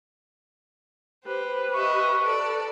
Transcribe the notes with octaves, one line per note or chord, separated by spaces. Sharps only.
G4 B4 C5
D#5 E5 C#6
A4 D5